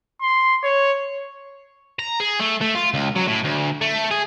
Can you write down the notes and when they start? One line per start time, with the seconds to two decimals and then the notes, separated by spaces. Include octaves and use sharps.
0.21 C6
0.63 C#5
1.99 A#5
2.20 G#4
2.40 A3
2.61 A3
2.75 F4
2.94 C#2
3.16 F#3
3.28 A2
3.45 D2
3.82 A3
4.11 G#4